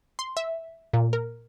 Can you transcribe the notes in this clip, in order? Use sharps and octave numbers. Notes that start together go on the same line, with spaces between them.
C6
E5
A#2
A#4